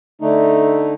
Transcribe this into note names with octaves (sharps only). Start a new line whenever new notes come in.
D3 A3 D#4